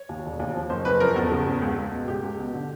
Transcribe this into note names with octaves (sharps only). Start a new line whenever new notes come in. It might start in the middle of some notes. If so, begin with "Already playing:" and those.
Already playing: C#5
D#2
E1
D#2
F3
F#1 C5
F#1 B4
F3 A#4
E2 A4
C#3
E2
C#2
C#2
B2
C#2 G4
C#2
B2
D3